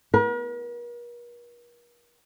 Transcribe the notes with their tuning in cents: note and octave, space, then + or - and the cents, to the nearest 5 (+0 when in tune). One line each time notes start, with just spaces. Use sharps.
A#4 +45